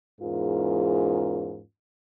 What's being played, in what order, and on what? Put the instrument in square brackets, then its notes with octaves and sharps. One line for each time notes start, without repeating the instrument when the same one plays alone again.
[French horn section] E2 G#2 C#4 F4 G#4 A#4